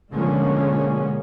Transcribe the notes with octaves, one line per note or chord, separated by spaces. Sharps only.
B2 D3 F3 G#3 A#3 C#4